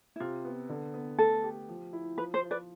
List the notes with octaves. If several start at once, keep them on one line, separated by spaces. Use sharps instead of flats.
E4
C3 F4
B3
D3
B3
A3 A4
G4
F3
E4
F3 B4
C5
F4
B4 D5